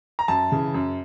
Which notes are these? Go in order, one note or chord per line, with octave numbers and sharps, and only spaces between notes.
A#5
F#2 A5
C#3 E3
F#2